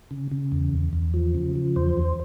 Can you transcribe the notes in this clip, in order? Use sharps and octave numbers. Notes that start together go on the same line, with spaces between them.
C#3
C#3
E2
E2
E2
F3
C#3
F3
E2 C5
E2